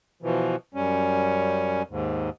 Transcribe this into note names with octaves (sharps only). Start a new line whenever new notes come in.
B2 E3 F3
F#2 G3 C#4
D#2 G#2